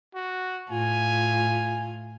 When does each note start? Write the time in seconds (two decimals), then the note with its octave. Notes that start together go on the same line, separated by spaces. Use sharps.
0.15 F#4
0.70 A2 F4 G#5